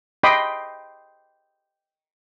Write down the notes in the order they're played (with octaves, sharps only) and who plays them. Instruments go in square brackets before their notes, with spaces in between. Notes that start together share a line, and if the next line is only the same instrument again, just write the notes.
[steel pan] D#5 G5 B5 C6 D6 D#6